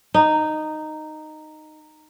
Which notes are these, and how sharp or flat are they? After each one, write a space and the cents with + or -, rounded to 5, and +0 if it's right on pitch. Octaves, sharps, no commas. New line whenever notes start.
D#4 -10